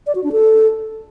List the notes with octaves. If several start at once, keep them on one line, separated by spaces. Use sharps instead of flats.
D5
F#4
D4
A4